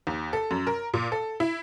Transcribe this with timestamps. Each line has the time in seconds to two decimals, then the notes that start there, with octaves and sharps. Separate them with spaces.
0.07 D#2
0.33 A4
0.51 F#2
0.67 A#4
0.94 A#2
1.12 A4
1.40 E4